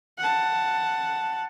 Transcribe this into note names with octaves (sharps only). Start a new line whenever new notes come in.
F#5 A5